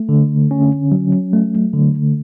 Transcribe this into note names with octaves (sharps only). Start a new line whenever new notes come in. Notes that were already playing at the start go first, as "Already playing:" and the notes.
Already playing: A3
D3
C#4
F#3
A3
D3